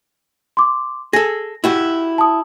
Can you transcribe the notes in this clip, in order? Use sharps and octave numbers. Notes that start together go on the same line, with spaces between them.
C6 D6
G#4 A4 A#6
E4 F#4 G4
A5 D#6